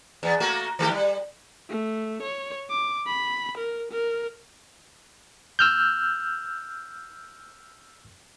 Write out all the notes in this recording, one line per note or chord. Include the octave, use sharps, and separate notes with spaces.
E2 B3
A3 A#3 F#4
D#3 A3 G4
G3
A3
C#5
D6
B5
A#4
A#4
E6 F6 G6